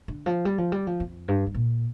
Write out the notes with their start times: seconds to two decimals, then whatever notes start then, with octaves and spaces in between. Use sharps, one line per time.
0.08 D3
0.26 F3
0.45 G3
0.58 F3
0.72 G3
0.87 F3
1.00 F2
1.28 G2
1.47 G2
1.54 A#2